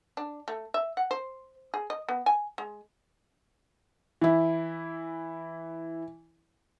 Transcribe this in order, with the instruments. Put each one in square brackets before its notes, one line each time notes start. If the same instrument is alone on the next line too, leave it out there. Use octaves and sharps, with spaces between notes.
[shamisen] D4
A3
E5
F#5
C5
G#4
D#5
B3
G#5
G#3
[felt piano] E3 E4